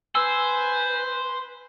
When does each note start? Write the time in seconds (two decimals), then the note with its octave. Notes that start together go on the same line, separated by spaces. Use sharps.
0.15 B4 C5 G#5 E6